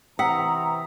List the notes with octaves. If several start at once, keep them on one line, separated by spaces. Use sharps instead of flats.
C3 E3 C4 F#5 A#5 D#6 E6 B6